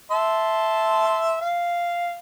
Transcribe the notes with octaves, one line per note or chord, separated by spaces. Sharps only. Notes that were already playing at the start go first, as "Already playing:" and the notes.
E5 A5 C6
F5